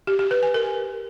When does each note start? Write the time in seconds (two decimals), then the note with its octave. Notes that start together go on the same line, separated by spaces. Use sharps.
0.07 G4
0.19 G4
0.31 B4
0.43 G#5
0.54 A#4